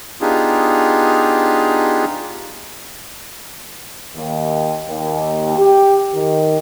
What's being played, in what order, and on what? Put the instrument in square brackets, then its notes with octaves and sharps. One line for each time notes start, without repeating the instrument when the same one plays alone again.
[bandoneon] B3 D4 D#4 F4 G4 G#4
[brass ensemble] D#2
D#2
G4
D#3